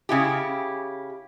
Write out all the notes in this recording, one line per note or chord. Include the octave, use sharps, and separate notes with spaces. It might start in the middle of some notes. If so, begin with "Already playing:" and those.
C#3 E4 G4